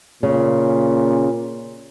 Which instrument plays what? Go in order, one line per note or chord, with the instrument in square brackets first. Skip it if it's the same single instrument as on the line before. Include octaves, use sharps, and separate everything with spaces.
[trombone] A#2 [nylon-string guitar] C#3